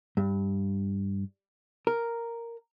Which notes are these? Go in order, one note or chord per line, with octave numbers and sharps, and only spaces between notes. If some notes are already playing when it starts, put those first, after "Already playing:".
G2
A#4